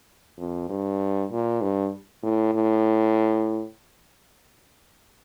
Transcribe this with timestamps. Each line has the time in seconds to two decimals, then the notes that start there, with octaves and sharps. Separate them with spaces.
0.38 F2
0.69 G2
1.31 A#2
1.62 G2
2.23 A2
2.54 A2